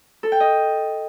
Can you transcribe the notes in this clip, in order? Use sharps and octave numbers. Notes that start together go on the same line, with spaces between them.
A4
G5
D#5